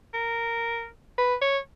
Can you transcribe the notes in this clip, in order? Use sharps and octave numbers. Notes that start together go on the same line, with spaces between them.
A#4
B4
C#5